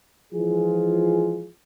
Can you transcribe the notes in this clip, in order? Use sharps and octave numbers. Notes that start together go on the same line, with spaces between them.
E3 F3 G#3 F4 G#4